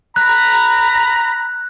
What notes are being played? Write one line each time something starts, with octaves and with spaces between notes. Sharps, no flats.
A#5 B5 F#6